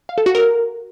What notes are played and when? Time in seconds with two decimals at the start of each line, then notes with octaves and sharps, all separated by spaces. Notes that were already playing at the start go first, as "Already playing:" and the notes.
0.09 F5
0.18 A4
0.26 F#4
0.35 A#4